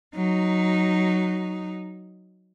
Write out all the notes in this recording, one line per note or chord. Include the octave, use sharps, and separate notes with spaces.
F#3 D#4